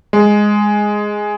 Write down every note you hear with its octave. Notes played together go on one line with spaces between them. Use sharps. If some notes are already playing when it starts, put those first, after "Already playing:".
G#3